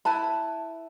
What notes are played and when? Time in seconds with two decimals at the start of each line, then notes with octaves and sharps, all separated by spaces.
0.05 E4 B4 A5 B5